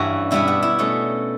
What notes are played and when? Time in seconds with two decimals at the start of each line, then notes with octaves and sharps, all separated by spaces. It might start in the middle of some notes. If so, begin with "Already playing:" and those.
Already playing: G2 E3 G3 C#4 F#4
0.31 B2 G3 B3 D4 E4
0.48 F#4
0.63 E4
0.79 B2 A3 C#4